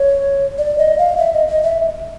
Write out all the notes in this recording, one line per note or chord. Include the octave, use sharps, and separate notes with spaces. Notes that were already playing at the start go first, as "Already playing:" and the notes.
Already playing: C#5
D5
D#5
F5
E5
D#5
D#5
E5